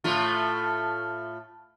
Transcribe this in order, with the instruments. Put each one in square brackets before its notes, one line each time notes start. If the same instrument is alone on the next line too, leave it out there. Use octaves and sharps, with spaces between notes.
[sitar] A2 A3 F4